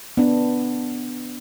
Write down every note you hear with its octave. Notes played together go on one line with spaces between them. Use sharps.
B3 D4